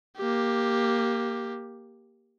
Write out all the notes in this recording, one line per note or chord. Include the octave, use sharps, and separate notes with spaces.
A#3 G4